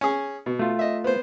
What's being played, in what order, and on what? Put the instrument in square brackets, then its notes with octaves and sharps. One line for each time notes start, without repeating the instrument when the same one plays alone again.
[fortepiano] C#4 G#4
B2
[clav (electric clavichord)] A3 F4
[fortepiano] D#5 E5
B3 C5